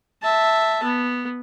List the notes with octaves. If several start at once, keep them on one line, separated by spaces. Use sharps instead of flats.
E5 A5
B3